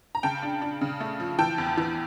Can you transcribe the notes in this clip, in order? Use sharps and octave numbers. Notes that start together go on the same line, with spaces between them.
A#5
C#3 G5 A5
D4
D4
C#3
A3
F3
E3 G5 A5
E2
E3